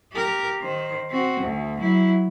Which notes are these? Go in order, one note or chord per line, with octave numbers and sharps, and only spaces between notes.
G4 A#4
D#3 C5
C4 F#4
D2
F#3 E4